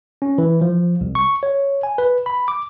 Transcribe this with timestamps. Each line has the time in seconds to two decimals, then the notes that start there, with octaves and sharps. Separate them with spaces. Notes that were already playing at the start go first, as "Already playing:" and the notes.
0.22 C#4
0.38 E3
0.61 F3
1.01 C2
1.15 C#6
1.43 C#5
1.83 G#5
1.98 B4
2.26 B5
2.48 D6